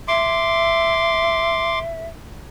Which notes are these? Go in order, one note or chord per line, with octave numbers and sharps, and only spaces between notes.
E5 C6 D6